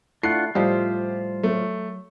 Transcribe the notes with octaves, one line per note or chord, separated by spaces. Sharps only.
A3 D4 E4 F4 F#5 C7
A2 F3 G3 F4 G4 C5 D#5
F#3 A3